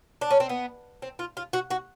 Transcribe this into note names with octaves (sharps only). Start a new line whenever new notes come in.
D4
C#4
C4
B3
C4
F4
F4
F#4
F#4